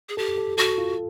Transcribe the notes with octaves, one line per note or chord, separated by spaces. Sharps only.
G#4
G4 A4
A4
F#4 A4
F4